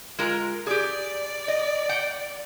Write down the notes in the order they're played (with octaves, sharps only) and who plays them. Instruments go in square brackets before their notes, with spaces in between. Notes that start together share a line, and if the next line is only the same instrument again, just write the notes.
[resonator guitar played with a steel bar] G#3 F4 A#4
[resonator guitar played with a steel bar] G4 G#4 [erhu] D5
[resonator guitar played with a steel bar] D#5
F#5 G5